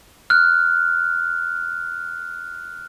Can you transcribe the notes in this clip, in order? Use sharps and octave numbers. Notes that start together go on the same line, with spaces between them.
F6 F#6